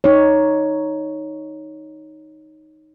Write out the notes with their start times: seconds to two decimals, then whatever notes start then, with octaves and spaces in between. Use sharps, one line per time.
0.04 D#4 C#5